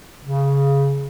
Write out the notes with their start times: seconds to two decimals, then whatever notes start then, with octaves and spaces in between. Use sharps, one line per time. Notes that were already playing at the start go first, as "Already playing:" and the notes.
0.24 C#3